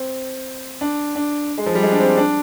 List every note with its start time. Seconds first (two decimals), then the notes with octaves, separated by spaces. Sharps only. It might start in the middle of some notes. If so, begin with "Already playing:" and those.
Already playing: C4
0.81 D4
1.15 D4
1.58 G#3
1.66 F3
1.75 G3
1.83 G#3
1.92 D4
2.00 C4
2.18 D4